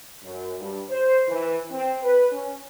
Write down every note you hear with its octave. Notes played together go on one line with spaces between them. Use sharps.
F#2
G2
C5
E3
C4
B4
C#4